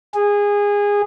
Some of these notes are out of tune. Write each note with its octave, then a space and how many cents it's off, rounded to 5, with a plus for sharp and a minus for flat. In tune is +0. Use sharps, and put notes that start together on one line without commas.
G#4 -20